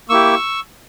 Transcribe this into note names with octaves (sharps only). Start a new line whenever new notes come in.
A#3 E4 G4 C#6 E6